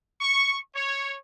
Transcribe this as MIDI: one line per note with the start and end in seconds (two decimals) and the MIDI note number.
0.20 0.58 85
0.75 1.15 73